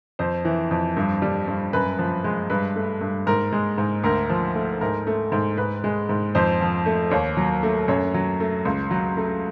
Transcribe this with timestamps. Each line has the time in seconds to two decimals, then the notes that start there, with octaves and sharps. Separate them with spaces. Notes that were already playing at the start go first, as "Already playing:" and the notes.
0.19 F2 C5
0.45 E3
0.71 F2
0.97 G2
1.22 G3
1.48 G2
1.73 F#2 B4
1.99 F3
2.24 G#3
2.50 G2 B4
2.76 A3
3.01 G2
3.27 G#2 A#4
3.53 G#3
3.78 G#2
4.03 D2 A#4
4.29 F3
4.55 A3
4.81 G#2 A#4
5.07 A3
5.32 G#2
5.57 G#2 B4
5.84 G#3
6.09 G#2
6.35 F2 C5
6.61 F3
6.86 A3
7.11 D#2 C#5
7.37 F#3
7.63 A3
7.88 F#2 C#5
8.14 F#3
8.40 A3
8.65 C#2
8.91 F#3
9.17 A3